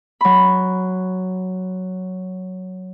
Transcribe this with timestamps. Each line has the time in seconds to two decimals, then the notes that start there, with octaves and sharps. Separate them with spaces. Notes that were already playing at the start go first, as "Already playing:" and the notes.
0.21 F#3 B5